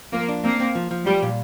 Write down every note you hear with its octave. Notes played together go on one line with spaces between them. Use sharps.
F3 A#3
D4
A#3 C4
C4
F3
F3
G3 G4
A#2